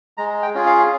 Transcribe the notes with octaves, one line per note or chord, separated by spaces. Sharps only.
G#3 A#5
G5
C#4 F4 G#4
F5